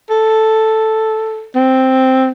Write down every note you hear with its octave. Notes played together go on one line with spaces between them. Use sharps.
A4
C4